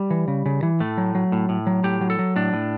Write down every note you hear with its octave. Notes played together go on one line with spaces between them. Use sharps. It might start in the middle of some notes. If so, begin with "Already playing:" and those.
Already playing: G3
E3
C#3
C#3
E3
A2 A3
F#3
F#3
A2
A2
F#3
A2 G4
F#3
A4
F#3
A2 D4
A2